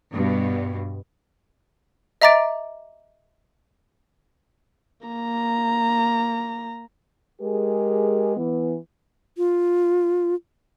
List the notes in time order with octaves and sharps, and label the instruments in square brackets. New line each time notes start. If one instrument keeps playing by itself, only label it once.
[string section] G2 B2
[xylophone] D#5 E5 A#5 D6 A6 D7
[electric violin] A#3 A#5
[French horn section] G#3 G4 G#4 A#4
E3 B3
[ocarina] F4